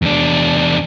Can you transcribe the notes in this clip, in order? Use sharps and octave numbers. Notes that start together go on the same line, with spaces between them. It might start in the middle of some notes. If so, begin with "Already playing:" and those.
E2 D4